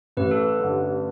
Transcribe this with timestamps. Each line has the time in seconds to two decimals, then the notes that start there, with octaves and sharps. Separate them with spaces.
0.17 A1 B4
0.31 A4
0.44 B4
0.60 G2 D3